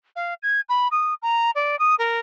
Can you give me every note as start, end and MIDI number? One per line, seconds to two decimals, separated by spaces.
0.16 0.34 77
0.43 0.61 92
0.69 0.88 83
0.91 1.14 87
1.22 1.51 82
1.55 1.78 74
1.79 1.95 87
1.99 2.19 70